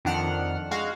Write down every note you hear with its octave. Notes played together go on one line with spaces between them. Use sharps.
F2 D#3 D4 F#5 F6
G#3 F#4 F5